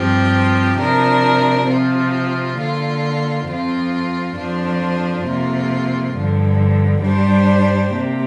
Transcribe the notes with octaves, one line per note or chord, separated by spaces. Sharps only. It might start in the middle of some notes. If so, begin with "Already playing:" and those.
Already playing: G2 F3 C4 G4
C3 F3 D4 A#4
C3 F3 C4 F4
D3 A#3 F4
F2 F3 C4 F4
F2 F3 D4 F4 C5
F2 C3 A#3 F4
G2 D3 F3
G2 G3 D4 G4 C5
C3 A#3 G4